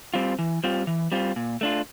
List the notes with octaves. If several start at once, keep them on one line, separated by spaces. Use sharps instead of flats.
G3 C4 F4
E3
G3 C4 F4
E3
G3 C4 F4
A#2
A3 D4 F4